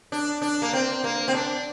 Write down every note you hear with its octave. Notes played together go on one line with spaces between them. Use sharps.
D4
D4
A#3
C4
A#3
C4
D4